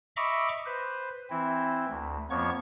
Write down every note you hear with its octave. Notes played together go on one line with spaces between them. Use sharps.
D#5 E5 A#5 B5 C#6 D6
B4 C5
E3 C4 E4
D2
F2 F3 A#3 B3 C#5 C#6